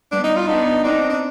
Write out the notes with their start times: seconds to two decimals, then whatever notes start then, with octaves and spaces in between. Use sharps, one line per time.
0.11 G3 B3 D4
0.24 D#4
0.36 F4
0.47 B3 D4 D#4
0.84 C4 D4 D#4
1.09 D4